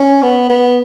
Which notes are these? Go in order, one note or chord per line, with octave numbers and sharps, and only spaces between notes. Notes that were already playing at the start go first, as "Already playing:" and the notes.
Already playing: C#4
B3
B3